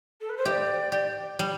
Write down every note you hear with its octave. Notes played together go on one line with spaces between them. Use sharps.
A4
B4
C5
G4 D5 E5
G4
G3